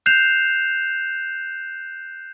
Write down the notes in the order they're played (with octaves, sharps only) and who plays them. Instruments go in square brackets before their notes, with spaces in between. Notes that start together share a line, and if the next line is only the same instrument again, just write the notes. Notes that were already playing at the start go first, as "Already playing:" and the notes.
[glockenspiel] F#6 G6 C7 E7 F7